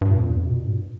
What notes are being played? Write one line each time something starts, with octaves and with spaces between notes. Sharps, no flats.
G2
A#2
F2
E2
F2
B2
A#2
G2